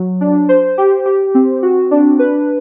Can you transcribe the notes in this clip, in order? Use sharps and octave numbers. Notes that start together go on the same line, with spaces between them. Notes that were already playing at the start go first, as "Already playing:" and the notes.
Already playing: F#3
D4
C5
G4
G4
C4
F#4
D4
B4